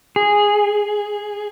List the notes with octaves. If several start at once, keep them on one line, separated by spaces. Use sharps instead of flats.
G#4